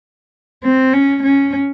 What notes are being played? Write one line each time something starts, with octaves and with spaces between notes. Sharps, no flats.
C4
C#4
C#4